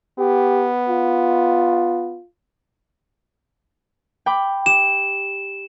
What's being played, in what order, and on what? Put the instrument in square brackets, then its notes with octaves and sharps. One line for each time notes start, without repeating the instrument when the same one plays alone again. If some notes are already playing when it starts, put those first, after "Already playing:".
[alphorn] B3 [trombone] G4
[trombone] F4
[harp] G5 B5 D6
[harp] G4 [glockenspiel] E7